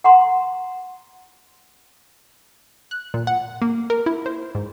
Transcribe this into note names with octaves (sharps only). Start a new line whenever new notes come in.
F#5 A#5 C6
F#6
A#2
F#5
A#3
A#4
E4
C5
G#2